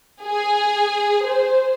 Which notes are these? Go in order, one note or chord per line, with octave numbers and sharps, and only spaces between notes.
G#4
C5